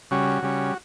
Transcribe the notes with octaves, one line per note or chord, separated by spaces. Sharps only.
C#3 G3 C#4 F#4
C#3 G3 C#4